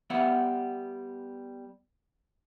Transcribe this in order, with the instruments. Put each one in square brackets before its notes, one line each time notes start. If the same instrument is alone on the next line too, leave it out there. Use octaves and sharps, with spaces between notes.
[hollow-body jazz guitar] G3 B3 E5 F#5